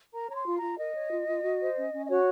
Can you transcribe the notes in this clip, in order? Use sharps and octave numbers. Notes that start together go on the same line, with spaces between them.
A#4 A#5
C#5 A#5
C6
F4
F4 A#5
A#4 D#5
C#5
F4
F4
F#4
C5
C#4
C#4
D#5
F#4 C#5